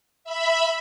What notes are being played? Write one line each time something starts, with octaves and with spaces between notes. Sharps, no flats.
E5 B5